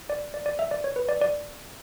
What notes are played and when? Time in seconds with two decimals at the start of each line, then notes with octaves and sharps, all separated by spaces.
0.10 D5
0.34 D5
0.46 D5
0.59 E5
0.71 D5
0.84 C#5
0.96 B4
1.09 D5
1.22 D5